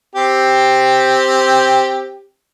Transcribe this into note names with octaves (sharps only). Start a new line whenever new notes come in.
C4 G4